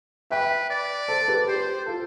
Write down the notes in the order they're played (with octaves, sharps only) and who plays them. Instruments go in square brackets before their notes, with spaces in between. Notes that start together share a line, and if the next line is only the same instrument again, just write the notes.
[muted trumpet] B4 [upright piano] E5 G5
[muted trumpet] D5
[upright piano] A4 C5
G4 B4
[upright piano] G4 [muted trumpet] C5
[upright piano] F4 A4